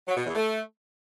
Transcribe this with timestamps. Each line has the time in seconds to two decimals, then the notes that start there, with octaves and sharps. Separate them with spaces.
0.08 F#3
0.17 B2
0.26 E2
0.35 A3